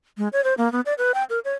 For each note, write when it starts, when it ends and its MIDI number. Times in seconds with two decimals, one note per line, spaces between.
0.18 0.28 56
0.33 0.44 73
0.44 0.54 72
0.58 0.71 58
0.72 0.81 59
0.86 0.94 74
0.98 1.12 71
1.14 1.24 79
1.30 1.39 70
1.45 1.54 73